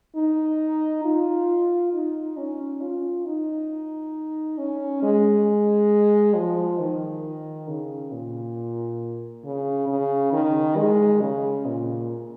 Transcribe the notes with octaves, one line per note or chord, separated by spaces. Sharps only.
D#4
F4
D#4
C#4
F4
D#4
C#4
G#3
F3
D#3
C#3
A#2
C#3
C#3
D#3
G#3
C#3
A#2